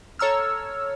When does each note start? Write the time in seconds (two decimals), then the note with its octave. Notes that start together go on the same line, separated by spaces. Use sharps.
0.19 A4 C#5 A#5 E6 F6